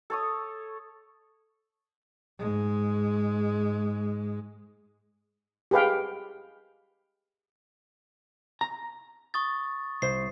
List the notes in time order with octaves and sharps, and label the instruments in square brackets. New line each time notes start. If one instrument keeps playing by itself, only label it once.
[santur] A4 C#5 D#6
[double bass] G#2 G#3
[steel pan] G4 G#4 B4 F5 G5
[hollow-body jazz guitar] A#5
[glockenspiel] C#6 D#6 A6
[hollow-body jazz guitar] C2 C5 [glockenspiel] C7